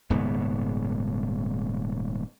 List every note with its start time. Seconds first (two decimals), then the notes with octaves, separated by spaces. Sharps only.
0.10 D#1 G#2 C#3 B3